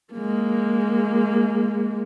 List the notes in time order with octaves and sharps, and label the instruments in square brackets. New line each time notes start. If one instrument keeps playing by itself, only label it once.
[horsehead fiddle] G#3 A#3